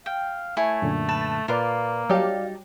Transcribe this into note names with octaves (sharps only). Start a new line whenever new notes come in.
F5 G5
A3 E4 C#5 G#5
F#2 A#2 D3
B4 A5
A#2 A#3 F4 B4 D5 F5 D6
F#3 G3 D#4 G4 D5 F5 A5